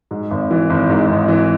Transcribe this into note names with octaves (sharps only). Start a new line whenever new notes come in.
G#2
G#1
E3
G#1
G#2
G#1
E3